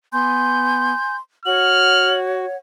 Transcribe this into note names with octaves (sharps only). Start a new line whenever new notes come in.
B3 G#5 C6 G6
F#4 C#5 F#5 F6 F#7